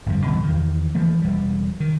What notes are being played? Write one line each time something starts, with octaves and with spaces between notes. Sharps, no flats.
G1 F2 G3
D1 B2 E3 G3
E2 D#3
E3 F3 A3 A#3
E1 G3
D#3